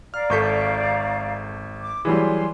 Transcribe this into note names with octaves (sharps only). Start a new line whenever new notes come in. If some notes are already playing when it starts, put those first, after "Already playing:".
D5 F5 A#5 F6
G#1 A4 C#6 G6 B6
D6
E3 F#3 G3 G#4 G#5 C6